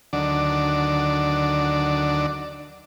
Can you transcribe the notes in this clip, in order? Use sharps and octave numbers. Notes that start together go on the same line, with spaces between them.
D2 D3 D#3 F#3 D4 D5